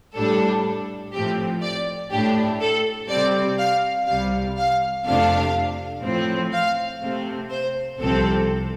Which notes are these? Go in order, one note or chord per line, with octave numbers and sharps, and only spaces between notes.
A2 G3 D4 A4
A2 F3 A3 C4 G4
D5
A2 A3 D4 G4
A4
C3 G3 C4 D5
F5
C2 C3 G3 F5
F5
F2 C3 A3 D4 F5
A2 F3 C4
F5
C3 A3 C4
C5
C2 C3 F3 C4 A4